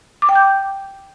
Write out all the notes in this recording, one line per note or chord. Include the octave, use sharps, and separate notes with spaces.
D6
G5
G6